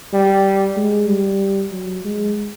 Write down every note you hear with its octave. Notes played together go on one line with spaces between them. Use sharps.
G3
G#3
G3
F#3
G#3